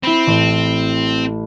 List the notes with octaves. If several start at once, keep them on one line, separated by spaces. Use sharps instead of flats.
C4 E4 B5
A1